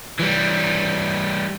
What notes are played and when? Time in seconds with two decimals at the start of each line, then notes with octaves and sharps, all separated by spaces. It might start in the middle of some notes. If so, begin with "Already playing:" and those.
0.20 E3 G3